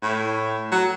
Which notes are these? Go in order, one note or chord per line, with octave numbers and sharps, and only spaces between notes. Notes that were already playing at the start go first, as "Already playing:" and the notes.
A2
F#3